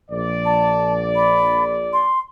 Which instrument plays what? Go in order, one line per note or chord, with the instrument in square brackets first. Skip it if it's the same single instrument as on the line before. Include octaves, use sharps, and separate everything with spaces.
[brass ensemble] A#1 D5
[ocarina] A5
B5
C6